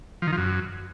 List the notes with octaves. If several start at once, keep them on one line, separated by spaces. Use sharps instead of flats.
F3
D#3
F3
F#2